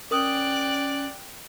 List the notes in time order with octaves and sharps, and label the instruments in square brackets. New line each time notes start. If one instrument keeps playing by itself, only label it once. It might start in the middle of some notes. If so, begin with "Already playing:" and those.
[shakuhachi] C#4 [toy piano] A#4 D#6 [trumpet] D5 [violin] G5 F#6